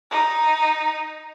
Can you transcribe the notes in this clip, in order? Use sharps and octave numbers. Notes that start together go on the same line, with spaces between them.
D#4